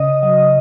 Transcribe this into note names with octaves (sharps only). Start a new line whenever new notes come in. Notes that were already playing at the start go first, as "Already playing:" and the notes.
Already playing: C#3 D#5 D#6
F#3